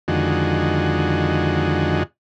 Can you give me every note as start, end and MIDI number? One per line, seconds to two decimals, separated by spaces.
0.08 2.03 41
0.08 2.03 50
0.08 2.03 51
0.08 2.03 56
0.08 2.03 66